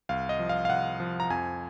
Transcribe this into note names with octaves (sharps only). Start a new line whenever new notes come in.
C2 F5
D#5
F3
F5
F5
C2 F#5
F3
A#5
F2 G#5